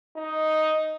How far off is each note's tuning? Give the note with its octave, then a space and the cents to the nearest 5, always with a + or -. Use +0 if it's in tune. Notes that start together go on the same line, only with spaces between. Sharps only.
D#4 +5